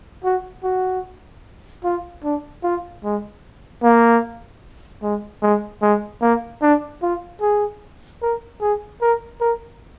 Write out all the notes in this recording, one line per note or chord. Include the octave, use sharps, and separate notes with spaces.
F#4
F#4
F4
D4
F4
G#3
A#3
G#3
G#3
G#3
A#3
D4
F4
G#4
A#4
G#4
A#4
A#4